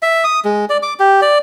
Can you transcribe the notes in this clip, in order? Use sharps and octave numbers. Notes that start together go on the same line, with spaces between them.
E5
D#6
G#3
D5
D6
G4
D5